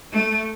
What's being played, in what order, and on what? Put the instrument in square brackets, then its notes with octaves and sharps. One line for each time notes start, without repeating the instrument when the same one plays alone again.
[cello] A3